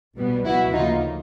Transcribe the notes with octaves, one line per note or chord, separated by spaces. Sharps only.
B1 B2 G3 B3
C#2 B2 F#3 B3 E4 F#4
D2 C#3 F3 A#3 D#4 F4